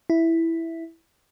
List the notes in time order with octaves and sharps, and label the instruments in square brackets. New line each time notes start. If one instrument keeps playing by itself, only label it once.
[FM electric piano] E4